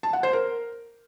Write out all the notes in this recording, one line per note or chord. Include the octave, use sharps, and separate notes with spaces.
A5
F#5
C5
A#4